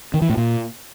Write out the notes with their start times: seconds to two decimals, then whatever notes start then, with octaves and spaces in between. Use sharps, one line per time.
0.14 D#3
0.22 E3
0.29 A2
0.37 A#2